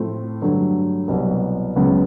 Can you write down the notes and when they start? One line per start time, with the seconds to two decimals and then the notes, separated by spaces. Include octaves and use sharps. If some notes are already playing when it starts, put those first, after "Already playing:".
Already playing: A2 F3 A3 C4 F4
0.42 G2 D3 F#3 A3
1.08 C2 B2 F#3
1.76 C#2 C#3 F#3 B3